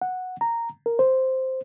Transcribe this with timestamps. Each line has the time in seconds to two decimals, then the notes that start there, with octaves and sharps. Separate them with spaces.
0.02 F#5
0.41 A#5
0.86 A#4
0.99 C5